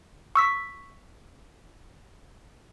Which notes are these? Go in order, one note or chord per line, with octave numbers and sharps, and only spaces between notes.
C#6 E6 B6